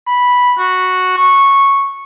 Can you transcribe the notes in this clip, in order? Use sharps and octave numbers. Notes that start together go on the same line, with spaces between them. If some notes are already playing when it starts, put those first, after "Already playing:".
B5
F#4
C#6